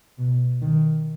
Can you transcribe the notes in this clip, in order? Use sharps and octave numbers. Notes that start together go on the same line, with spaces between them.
B2
D#3